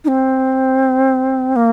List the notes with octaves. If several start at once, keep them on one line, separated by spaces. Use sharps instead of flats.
D#4
C4
A#3